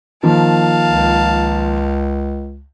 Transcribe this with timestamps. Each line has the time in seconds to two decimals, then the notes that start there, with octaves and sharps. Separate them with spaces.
0.23 D#3 F3 A#3 F5 A5
0.89 C#2